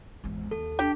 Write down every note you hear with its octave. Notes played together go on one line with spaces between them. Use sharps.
G#1 E2
D#2 A4
D4 G4